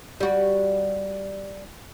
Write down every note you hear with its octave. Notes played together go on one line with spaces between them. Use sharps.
G3 F#4